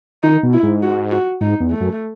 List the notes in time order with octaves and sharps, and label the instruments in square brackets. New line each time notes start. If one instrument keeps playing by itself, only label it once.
[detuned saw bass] D#3 [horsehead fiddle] D#4
[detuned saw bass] B2
[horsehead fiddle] E4
[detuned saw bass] G#2
[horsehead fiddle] F#4
F#4
[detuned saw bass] G#2 [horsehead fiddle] D#4
[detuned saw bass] E2
[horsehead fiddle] A3
[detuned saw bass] F#2